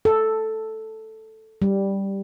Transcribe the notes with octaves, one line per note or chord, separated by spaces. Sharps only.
A4
G3